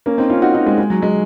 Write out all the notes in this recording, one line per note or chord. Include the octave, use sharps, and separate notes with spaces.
A#3 C#4
C4 D#4
C#4 F4
D#4 F#4
D#4 F#4
G#3 C4
G#3
F#3
G#3